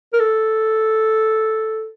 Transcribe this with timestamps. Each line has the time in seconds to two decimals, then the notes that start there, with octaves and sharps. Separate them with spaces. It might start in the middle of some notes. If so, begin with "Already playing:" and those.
0.13 A#4
0.20 A4